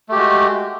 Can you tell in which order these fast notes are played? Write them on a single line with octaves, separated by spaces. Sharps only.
A3 G4 G#3 F#4